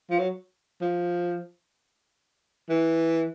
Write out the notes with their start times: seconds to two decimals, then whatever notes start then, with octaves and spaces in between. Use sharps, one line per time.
0.10 F3
0.19 F#3
0.81 F3
2.69 E3